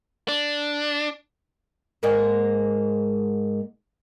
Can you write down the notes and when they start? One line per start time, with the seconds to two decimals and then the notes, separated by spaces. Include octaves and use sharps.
0.28 D4
2.03 G#2 G#3 A#3